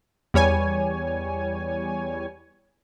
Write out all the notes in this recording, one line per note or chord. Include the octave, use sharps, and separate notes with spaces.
E2 G3 C#5 G#5